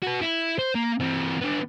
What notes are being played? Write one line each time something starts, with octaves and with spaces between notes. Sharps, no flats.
F#4 B4
E4
C5
A#3
E3 C4
B3 D4